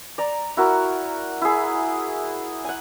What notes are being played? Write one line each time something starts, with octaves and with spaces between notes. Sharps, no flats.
D5 A#5
E4 F#4 A#4
E4 G#4
F#5 G#5